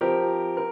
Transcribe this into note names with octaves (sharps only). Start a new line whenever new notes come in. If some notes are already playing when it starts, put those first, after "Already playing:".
F3 C4 G4 A#4
A#4